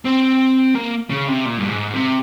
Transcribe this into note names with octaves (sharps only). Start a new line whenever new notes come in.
C4
A#3
C#3
C3
A#2
G2
G#2
C3